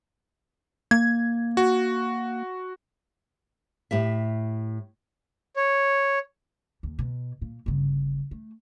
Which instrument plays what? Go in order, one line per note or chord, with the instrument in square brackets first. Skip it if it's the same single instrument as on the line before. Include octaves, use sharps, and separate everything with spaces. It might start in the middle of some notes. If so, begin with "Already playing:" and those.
[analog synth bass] A#3 [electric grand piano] G#6
[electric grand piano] F#4
[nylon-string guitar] A2 G4 E5
[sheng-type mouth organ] C#5
[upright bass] D#2
B2
A#2
G1 C#3
A3